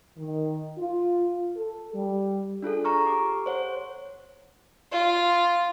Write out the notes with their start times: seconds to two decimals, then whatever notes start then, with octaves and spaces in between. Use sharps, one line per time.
0.18 D#3
0.78 F4
1.56 A4
1.94 G3
2.63 D4 F4 G#4 A4
2.84 A#5 C#6 F6
3.05 G4 D6
3.46 C5 C#5 F#5
4.92 F4